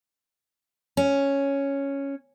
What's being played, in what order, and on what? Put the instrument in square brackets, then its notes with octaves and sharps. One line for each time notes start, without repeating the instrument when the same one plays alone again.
[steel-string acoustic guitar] C#4